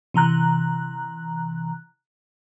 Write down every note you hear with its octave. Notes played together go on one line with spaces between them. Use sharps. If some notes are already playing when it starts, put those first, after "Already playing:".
C3 E3 A#5 F#6